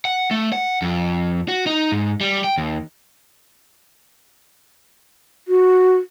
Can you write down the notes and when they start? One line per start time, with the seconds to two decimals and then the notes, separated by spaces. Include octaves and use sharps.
0.05 F#5
0.31 A3
0.53 F#5
0.82 F2
1.48 F#4
1.67 D#4
1.92 G#2
2.21 G3
2.44 G5
2.58 D#2
5.48 F#4